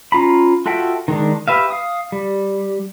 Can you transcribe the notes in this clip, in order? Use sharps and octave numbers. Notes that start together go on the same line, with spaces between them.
C#4 F4 A#5 B5
F4 F#4 A4 E5 G5
D#3 G#3 D4
G4 B4 E5 F5
F5 D#6
G3